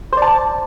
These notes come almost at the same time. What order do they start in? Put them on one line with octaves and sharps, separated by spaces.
C5 D5 A5